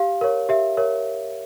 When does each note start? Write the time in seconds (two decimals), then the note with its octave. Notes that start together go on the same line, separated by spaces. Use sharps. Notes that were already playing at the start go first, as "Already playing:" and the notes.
Already playing: G4 F5
0.21 A#4 C#5
0.49 G4 E5
0.77 A#4 C#5